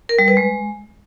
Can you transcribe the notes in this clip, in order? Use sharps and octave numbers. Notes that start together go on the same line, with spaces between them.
A#4
G3
B4
G#3